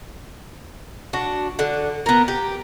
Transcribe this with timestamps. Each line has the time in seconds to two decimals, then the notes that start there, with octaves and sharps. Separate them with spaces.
1.13 D4 F#4
1.59 D3 F#5
2.06 B3 A#4
2.28 G4